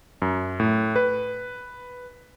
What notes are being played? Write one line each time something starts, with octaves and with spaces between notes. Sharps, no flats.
F#2
A2
B4